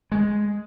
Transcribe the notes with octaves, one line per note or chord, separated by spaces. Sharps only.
G#3